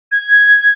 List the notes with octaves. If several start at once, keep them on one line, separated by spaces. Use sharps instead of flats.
G#6